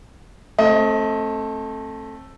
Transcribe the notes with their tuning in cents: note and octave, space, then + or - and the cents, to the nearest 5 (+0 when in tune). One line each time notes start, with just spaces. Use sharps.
A3 +0 C4 +30 D#5 +25